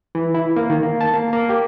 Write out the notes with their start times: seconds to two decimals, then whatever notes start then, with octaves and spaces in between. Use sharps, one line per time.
0.15 E3
0.34 E4
0.56 A#3
0.70 D#3
0.83 A#3
1.01 A5
1.14 A#3
1.33 A#3
1.49 G4